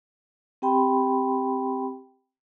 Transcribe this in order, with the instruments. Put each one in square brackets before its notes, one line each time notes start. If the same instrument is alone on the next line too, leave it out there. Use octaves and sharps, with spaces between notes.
[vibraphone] C4 G4 G5 B5 C6